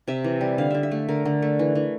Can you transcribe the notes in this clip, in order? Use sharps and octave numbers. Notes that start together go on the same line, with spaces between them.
C3 E5
E3
G3
D3 F5
D3 E5
E5
A3
D3 A#4
D3
A3
E3
E3